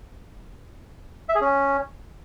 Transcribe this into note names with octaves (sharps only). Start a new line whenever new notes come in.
E5
G#4
C#4